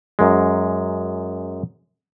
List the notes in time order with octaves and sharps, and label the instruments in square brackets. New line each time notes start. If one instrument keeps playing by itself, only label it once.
[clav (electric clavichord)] F#2 G#3